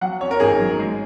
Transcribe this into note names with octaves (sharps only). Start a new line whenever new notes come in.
F#3 F#5
C#4 C#5
A#4
G#1 G#4
F#3
G#3